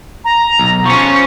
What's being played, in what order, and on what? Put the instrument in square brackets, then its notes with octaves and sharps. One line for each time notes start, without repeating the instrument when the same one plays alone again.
[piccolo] A#5
[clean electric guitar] B1
[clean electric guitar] F3 C#4 [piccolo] C#6